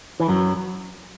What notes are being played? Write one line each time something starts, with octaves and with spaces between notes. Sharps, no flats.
E3
F#2 F#3